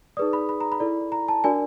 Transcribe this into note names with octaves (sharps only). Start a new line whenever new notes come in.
D#4 G#4 B4 D5 D#6
B5
B5
A#5
B5
E4 A4 D5
A#5
A5
D4 F#4 A#4 D5 G#5